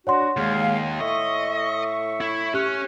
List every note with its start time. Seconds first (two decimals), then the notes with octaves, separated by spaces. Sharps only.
0.07 D4 F#4 C#5 F#5 C6
0.37 D#2 G#3 F5
1.00 A2 D#5 E5 C#6
2.21 E4
2.54 C#4 G4 F#6